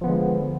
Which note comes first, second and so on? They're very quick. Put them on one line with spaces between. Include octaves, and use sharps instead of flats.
F3 B3 D3 G#3